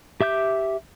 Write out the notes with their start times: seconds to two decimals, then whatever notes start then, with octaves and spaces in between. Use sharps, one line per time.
0.21 G4 E5 D6 G6